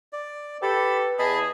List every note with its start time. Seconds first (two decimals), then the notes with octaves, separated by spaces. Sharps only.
0.13 D5
0.63 G4 A4 B4 B5
1.19 E2 G#4 D#5 A5 B5